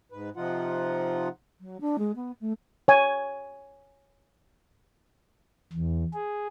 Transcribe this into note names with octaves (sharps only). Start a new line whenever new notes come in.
G#2 B4
C3 F3 D#4 F4 F#5
F#3
D4
G#3
B3
A3
C#5 G#5
E2
G#4